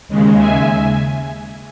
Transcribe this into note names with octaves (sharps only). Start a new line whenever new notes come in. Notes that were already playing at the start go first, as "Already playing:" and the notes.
D#2 C#3 G#3
E5 G#5